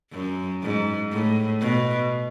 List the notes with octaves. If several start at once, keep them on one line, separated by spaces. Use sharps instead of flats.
F#2
G#2
A2
B2